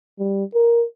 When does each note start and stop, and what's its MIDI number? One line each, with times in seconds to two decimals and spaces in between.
0.19 0.44 55
0.54 0.85 70